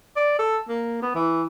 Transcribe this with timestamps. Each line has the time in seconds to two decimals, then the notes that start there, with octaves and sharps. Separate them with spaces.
0.16 D5
0.39 A4
0.68 A#3
1.02 B3
1.15 E3